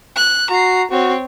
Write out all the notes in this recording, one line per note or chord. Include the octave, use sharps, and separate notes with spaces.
F#6
F#4 A#5 C7
C4 F#4 C#5